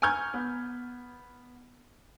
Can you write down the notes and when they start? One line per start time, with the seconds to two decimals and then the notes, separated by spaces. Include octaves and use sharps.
0.02 G#5 A#5 C#6 F6 G6 G#6
0.34 B3